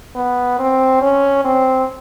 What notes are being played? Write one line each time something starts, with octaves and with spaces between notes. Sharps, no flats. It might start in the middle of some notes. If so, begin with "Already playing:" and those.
B3
C4
C#4
C4